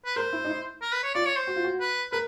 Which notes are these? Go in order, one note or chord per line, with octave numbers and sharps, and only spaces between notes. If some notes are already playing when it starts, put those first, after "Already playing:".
B4
A#4 C5
E4
D#4
E4
A#4
B4
C#5
F4 D5
C#5
C5
F#4
F4
F#4
B4
A#4 B4